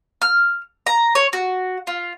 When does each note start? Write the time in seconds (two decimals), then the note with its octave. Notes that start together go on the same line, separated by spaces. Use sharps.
0.22 F6
0.86 A#5
1.15 C#5
1.33 F#4
1.87 F4